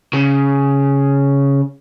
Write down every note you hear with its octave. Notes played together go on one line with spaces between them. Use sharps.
C#3